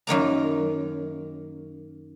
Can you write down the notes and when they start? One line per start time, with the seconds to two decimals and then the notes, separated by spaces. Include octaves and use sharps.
0.07 F#2 D#3 A#3 A#5